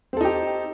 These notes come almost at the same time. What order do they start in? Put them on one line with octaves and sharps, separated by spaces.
C4 A4 D#4 G4